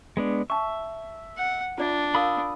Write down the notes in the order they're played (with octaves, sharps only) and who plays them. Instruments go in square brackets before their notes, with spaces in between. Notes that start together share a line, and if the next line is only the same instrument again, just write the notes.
[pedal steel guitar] G#3 B3 D4
[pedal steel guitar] E5 [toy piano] A5 C#6
[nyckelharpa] F#5
[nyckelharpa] D4 [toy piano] F4 D5 E5
[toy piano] A#4 F5 [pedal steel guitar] B5 D#6 E6